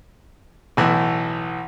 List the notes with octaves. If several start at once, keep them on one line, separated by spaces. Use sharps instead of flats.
B1 A2 E3